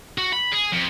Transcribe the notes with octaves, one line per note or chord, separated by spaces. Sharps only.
F#4
B5
G#4
F2